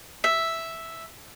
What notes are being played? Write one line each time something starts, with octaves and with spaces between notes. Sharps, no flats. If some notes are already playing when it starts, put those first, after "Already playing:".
E5